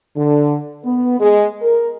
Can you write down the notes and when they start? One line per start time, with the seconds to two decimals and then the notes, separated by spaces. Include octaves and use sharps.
0.17 D3
0.85 B3
1.20 G#3
1.62 A#4